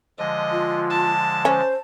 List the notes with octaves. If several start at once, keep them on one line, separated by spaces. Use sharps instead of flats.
D3 F3 G#3 D#5
F4
A5
C#4 C5